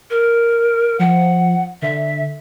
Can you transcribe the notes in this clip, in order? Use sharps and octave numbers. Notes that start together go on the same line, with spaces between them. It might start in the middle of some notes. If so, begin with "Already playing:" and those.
A#4
F3 F#5
D3 E5